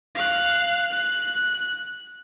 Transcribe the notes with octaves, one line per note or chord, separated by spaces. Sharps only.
F5 F#6
F#6